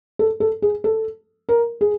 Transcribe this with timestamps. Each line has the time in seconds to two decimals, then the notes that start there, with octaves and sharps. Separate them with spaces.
0.19 A4
0.40 A4
0.62 G#4
0.84 A4
1.49 A#4
1.81 G#4